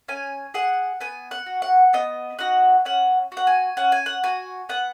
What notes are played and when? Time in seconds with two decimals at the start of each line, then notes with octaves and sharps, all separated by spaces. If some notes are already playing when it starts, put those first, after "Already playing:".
0.08 C#4 G#5
0.54 G#4 F#5
1.01 B3 G#5
1.31 F#5
1.46 F#4
1.62 F#5
1.93 B3 D#5
2.39 D#4 F#4 F#5
2.85 C#4 F#5
3.32 F#4
3.37 F#5
3.47 G#5
3.77 C#4 F#5
3.92 G#5
4.06 F#5
4.24 F#4 G#5
4.69 B3 F#5